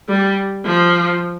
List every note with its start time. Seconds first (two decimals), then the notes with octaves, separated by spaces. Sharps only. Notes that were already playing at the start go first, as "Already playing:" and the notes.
0.09 G3
0.65 F3